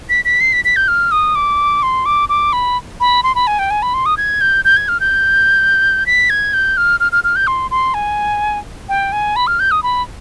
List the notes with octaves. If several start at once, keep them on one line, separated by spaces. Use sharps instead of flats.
B6
B6
C7
B6
B6
G6
F6
D#6
D6
C6
D6
D6
B5
B5
C6
B5
G#5
G5
G#5
B5
C6
D#6
G#6
G6
G6
G#6
F6
G6
B6
G#6
G6
F6
F6
F6
F6
G6
C6
C6
G#5
G5
G#5
B5
F6
G6
D#6
B5